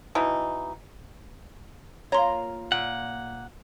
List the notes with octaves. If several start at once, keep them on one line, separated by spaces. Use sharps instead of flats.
B2 E3 D#4
A#3 F4 C#5 F5 A#5 C6
A#2 F#5